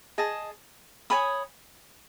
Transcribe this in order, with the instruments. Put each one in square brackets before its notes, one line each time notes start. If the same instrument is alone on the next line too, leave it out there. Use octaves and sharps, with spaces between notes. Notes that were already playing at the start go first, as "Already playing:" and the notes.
[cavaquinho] G#4 D#5 A5
C#5 G#5 B5 D#6